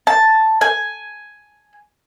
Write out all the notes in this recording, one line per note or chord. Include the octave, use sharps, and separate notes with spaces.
A5
G#5